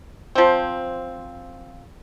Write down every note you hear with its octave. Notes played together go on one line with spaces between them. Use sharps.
F3 C4